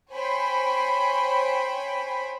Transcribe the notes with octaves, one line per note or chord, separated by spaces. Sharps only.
C5 C#5 G5 G#5 B5